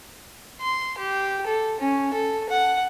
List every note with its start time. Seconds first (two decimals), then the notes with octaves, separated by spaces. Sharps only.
0.61 C6
0.98 G4
1.46 A4
1.80 C#4
2.14 A4
2.50 F#5